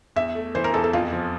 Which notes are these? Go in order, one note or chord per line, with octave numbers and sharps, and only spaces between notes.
E2 E5
A3
E3 C5
A#4
E2 A4
A4
F2 F4
F3